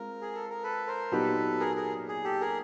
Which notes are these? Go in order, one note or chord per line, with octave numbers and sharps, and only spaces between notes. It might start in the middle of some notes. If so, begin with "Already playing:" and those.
Already playing: G#3 C4 F4 A#4
G#4
A4
A#4
A4 B4
A#4 C5
A#2 F#3 B3 D#4 G4 A4 B4
G#4 A#4
G#4 A#4
G#4
G4 A4
G#4 A#4